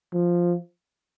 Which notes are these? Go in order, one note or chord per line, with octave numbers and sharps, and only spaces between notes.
F3